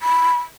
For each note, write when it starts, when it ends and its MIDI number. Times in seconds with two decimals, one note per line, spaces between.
0.01 0.37 83